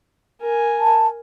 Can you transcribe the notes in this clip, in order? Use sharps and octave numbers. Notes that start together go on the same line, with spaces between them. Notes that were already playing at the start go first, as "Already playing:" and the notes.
A#4 G#5
A5